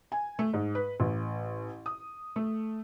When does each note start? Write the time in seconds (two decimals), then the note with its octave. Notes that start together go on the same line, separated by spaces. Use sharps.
0.12 G#5
0.39 A3
0.53 G#2
0.75 B4
1.00 A1
1.86 D#6
2.36 A3